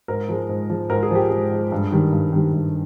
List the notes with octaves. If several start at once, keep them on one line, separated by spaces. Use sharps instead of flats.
G#2 A#4
F3 G#3
G#2
F3 G#3
G#2 A#4
G#4
F3 G#3 G4
G#2 G#4
F3 G#3
G2
D#3 G3
G2
D#3 G3
G2